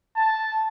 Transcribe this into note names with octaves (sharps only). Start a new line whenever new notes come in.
A5